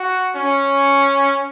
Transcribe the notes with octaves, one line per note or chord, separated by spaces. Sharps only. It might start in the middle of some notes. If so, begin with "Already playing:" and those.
Already playing: F#4
C#4